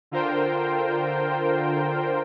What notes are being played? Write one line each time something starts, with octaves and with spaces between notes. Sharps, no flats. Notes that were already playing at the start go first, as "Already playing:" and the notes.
D3 F4 A#4 C5 G5